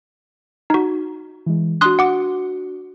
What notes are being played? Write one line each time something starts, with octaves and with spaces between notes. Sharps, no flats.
D#4 F#4
E3 G#3
D4 F#4 C6 D#6 F#6
F#5 D6